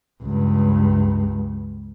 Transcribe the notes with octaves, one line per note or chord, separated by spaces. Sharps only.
C#2 G2